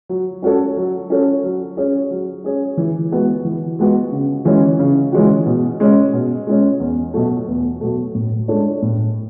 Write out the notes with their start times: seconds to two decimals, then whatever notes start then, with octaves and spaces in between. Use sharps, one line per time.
0.09 F#3
0.42 C#4 F#4 A4 C#5
0.77 F#3
1.10 C#4 F#4 A4 C#5
1.44 F#3
1.77 C#4 G#4 C#5
2.11 F#3
2.44 C#4 G#4 C#5
2.77 E3
3.12 G#3 B3 F#4
3.45 E3
3.79 G#3 B3 F#4
4.12 C#3
4.45 E3 G#3 C#4 F#4
4.79 C#3
5.12 E3 G#3 C#4 F#4
5.46 B2
5.80 G#3 C#4
6.13 B2
6.47 G#3 C#4
6.80 E2
7.14 B2 F#3 A3
7.48 E2
7.81 B2 F#3 A3
8.15 A2
8.48 G#3 D4 A4 C#5
8.82 A2